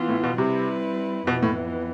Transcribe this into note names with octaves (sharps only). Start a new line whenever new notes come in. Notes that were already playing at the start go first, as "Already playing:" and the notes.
Already playing: E3 B3 F4
A2
B2
C3 G3 C4 E4 B4
F2 B2 E3 B3
A2